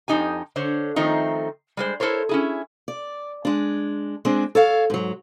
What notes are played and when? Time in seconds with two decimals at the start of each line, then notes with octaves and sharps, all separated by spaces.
0.08 F2 E3 D#4 G4 G#5
0.56 D3 C5 C#5
0.96 D#3 F3 A3 C4 D#4
1.77 G3 G#3 C5
2.00 E4 A4 A#4 C5 C#5
2.29 C#4 E4 G#4
2.88 D5
3.45 G#3 D4
4.25 G#3 C4 D4 G#4
4.55 A4 C#5 F5
4.90 G#2 F#3